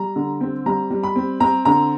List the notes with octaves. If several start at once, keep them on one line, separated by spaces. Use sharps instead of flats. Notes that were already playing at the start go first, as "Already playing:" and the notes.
Already playing: G3 A#5
D3
C4
G3 A#5
G3
B5
C4
C4 A#5
D3 A#5